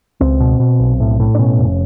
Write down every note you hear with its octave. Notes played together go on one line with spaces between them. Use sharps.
C#2 C4
B2
B2
B1
A2
A2
D4
B2 C#4
F1